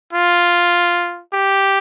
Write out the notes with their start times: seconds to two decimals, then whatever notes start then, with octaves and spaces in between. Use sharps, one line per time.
0.13 F4
1.34 G4